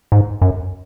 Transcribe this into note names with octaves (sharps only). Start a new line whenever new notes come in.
G#2
F#2